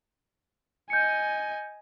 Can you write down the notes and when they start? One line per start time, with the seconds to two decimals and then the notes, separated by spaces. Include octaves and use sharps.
0.90 D#5 G#5 G6 C#7